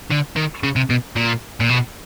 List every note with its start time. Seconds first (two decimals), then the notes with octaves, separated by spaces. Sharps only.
0.10 D3
0.36 D#3
0.63 C#3
0.76 C3
0.90 B2
1.16 A#2
1.60 A#2
1.69 B2